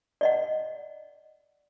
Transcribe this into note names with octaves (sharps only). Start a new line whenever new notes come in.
D5 D#5 F#5